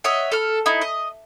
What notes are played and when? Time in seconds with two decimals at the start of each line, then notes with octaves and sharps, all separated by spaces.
0.04 C#5 D#5 E5 F#5
0.32 A4 F6
0.66 D#4 E4
0.82 D#5